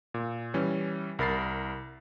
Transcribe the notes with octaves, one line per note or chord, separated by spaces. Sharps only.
A#2
E3 G3 C#4
C2 A#4 B5 A6 C7